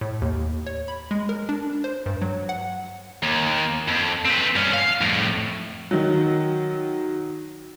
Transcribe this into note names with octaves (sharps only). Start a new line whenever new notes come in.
A2
D#2
C#5
B5
G#3
A#4
D4
C5
G2
F#3
F#5
D#2
F2
C4 B4
G2 C#4
F5
F2 A2
D#3 F#3